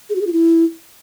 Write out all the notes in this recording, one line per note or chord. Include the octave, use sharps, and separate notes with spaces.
G#4
F#4
G#4
F4
E4